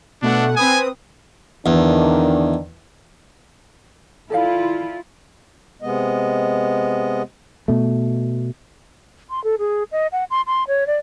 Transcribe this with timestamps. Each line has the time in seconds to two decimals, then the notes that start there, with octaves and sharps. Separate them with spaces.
0.22 B2 A3 D4 F#5
0.56 C4 B4 G#5 D#6
1.66 E2 D3 D#3 D4
4.30 D#3 E4 F4 A4 D5 F5
5.82 C3 G#3 B3 D#5
7.68 B2 A3
9.30 C6
9.44 A4
9.59 G#4
9.92 D#5
10.12 F#5
10.30 C6
10.47 C6
10.68 C#5
10.87 D5